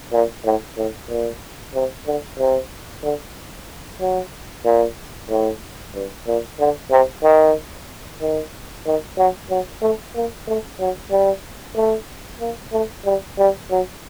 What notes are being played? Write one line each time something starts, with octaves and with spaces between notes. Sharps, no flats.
A#2
A2
A2
A#2
C3
D3
C3
D3
F#3
A#2
A2
G2
A#2
D3
C3
D#3
D#3
D#3
F#3
F#3
A3
A#3
A3
F#3
G3
A3
A#3
A3
G3
G3
F#3